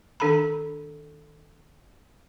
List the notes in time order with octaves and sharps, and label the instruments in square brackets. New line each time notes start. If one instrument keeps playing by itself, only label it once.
[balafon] D#3 D4 A4 A#5 B5